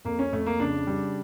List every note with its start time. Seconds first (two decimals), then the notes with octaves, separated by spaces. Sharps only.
0.05 F2 A#3
0.19 C#4
0.32 F2 A3
0.46 A#3
0.60 C#3 D4
0.87 G3